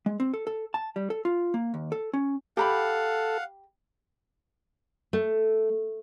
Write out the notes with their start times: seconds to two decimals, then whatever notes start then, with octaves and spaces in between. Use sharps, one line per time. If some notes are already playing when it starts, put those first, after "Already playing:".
0.06 G#3
0.20 C4
0.34 A4
0.47 A4
0.74 A5
0.96 G3
1.10 A4
1.25 F4
1.54 A#3
1.74 D#2
1.92 A4
2.13 C#4
2.57 G4 A4 F5 F#5 A#5 B5
5.13 A3